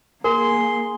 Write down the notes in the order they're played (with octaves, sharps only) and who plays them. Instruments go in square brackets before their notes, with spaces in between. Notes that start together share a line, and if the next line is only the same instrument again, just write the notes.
[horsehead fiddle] A#3 [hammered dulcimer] G#4 [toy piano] A#4 [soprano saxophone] C6